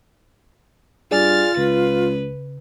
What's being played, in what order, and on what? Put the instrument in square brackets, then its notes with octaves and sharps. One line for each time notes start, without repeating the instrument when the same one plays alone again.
[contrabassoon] G2 [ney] F4 [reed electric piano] G#4 D5 G#5 [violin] F6 A6
[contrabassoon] C#2 [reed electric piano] C#3 [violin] B4